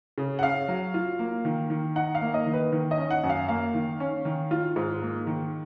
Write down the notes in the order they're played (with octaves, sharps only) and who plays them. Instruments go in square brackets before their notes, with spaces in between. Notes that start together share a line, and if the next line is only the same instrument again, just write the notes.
[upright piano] C#3
F#5
C#4 F5
F#3
F4
A#3
D#3
D#3
D#4 F#5
F5
A#3
D#5
D#3
B4
D#3
D#5
C#4
F#5
F#2
F5
A#3 F5
D#3
C#4
D#3
F4
G#2
A#3
D#3